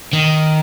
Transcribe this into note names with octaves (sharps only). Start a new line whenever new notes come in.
D#3